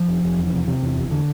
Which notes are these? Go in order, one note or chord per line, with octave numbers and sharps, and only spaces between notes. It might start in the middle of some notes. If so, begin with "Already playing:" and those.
Already playing: F3
F1
F1
E2
C3
C3
E2
F1
D3